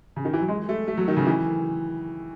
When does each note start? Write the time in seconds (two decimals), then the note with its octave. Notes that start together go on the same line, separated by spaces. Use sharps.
0.16 C#3
0.25 D#3
0.33 E3
0.41 F#3
0.49 G#3
0.69 A3
0.88 A3
0.97 F#3
1.08 D#3
1.17 C#3
1.27 E3